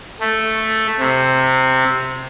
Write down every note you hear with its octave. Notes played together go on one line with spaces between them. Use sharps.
A3
C3